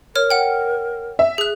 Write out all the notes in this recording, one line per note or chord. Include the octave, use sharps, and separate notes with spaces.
A#4 C#5 F6
F#5 G5
E5
G#4 F#6